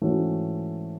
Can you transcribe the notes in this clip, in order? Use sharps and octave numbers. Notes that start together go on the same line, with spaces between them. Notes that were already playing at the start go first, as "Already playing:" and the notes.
G#2 E3 A3 C#4 F#4